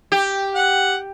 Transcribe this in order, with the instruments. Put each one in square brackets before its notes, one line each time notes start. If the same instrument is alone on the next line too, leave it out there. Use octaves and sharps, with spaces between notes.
[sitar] G4
[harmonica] F#5